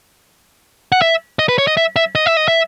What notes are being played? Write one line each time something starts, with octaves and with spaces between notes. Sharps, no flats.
F#5
E5
D#5
B4
C#5
D#5
E5
E5
D#5
E5
D#5
E5